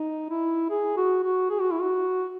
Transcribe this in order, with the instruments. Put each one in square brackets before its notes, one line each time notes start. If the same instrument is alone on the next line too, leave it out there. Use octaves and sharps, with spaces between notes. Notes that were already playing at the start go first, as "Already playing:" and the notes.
Already playing: [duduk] D#4
E4
G#4
F#4
F#4
G#4
F#4
E4
F#4